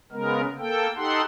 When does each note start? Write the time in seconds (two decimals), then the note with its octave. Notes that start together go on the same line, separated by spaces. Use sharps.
0.12 C#3 G#3 B3 A#4
0.58 A#3 A4 G5
0.96 D#4 G4 A4 F#5 C6